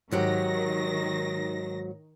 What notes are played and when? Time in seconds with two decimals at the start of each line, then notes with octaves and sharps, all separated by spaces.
0.11 G#2 D#3 F#3 G4 A#6